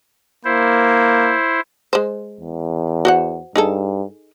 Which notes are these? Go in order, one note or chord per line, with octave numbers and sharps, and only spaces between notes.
A#3 E4 C5
G#3 C5
E2
F#4 C5 F#5
G2 D#4 G#4 A4